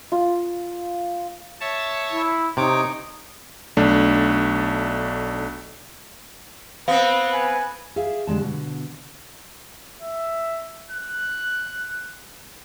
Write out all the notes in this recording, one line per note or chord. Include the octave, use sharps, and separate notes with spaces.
F4
C#5 E5 A5
E4
C3 D#4 C#5 D6
B1 A3 D4
B3 C4 B4 F5
G#5
G#4 E5 F5
D3 G3 G#3 A5
B2 D3
E5
F#6